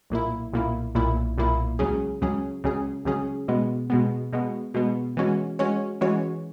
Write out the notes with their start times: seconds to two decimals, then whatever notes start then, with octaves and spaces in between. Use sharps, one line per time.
0.10 B1 A#2 A#3 E4
0.53 B1 A#2 A#3 E4
0.95 B1 A#2 A#3 E4
1.38 B1 A#2 A#3 E4
1.79 C#2 C#3 F#3 C#4 G#4
2.22 C#2 C#3 F#3 C#4 G#4
2.64 C#2 C#3 F#3 C#4 G#4
3.05 C#2 C#3 F#3 C#4 G#4
3.48 B2 G#3 B3
3.90 B2 G#3 B3
4.33 B2 G#3 B3
4.74 B2 G#3 B3
5.17 E3 G#3 C#4 F#4 C#5
5.59 E3 G#3 C#4 F#4 C#5
6.01 E3 G#3 C#4 F#4 C#5